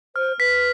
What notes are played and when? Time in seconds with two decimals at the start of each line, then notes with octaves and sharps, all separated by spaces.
0.16 C5 F6
0.39 B4 B6